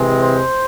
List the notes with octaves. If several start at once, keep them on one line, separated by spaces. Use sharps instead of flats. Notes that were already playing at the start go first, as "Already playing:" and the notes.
Already playing: C3 E3 G#3 C4
C5